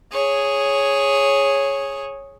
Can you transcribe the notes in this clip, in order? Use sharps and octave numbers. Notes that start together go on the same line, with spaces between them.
G#4 C#5